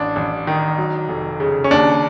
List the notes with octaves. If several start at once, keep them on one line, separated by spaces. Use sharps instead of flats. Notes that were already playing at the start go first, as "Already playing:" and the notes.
Already playing: A1 D4
A1
D#3
F#3
F1
C#3
C#4
D#2 D4